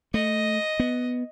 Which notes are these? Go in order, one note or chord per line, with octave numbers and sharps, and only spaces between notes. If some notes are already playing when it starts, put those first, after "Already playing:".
A3 D#5
B3